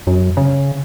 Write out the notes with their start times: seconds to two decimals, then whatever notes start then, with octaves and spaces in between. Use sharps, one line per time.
0.07 F#2
0.37 C#3